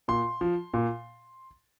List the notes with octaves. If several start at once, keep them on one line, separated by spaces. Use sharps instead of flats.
A#2 C6
F3
A#2